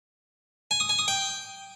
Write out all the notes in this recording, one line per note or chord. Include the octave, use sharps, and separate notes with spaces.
G#5
D#6
G#5
D#6
G5